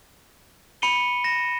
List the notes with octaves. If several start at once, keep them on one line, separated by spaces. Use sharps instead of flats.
B5 C#7 D#7 G7
A#6 E7